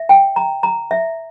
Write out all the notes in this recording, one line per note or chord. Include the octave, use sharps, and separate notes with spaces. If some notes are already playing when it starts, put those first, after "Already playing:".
Already playing: E5
G5
A#5
A#5
E5